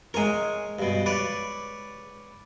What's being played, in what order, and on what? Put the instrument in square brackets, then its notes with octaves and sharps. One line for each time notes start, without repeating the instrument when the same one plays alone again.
[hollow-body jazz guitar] G#3 A#4 [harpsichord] C#5 G#5
[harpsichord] G2 B2
B4 C#5 D5